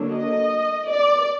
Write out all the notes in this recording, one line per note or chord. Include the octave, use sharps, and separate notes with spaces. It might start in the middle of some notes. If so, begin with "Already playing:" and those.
Already playing: D3 F#3 A#3 D4
D#5
D5